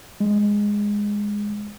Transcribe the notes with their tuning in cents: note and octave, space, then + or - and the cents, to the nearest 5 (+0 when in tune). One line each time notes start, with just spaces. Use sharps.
G#3 -10